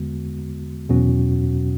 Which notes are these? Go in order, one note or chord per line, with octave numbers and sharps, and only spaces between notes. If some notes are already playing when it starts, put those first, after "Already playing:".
Already playing: E2 D3 G#3 B3 F#4
E2 B2 F#3 C#4 F#4